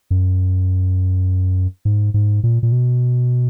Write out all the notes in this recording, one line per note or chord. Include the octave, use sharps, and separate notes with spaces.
F#2
G#2
G#2
A#2
A#2
B2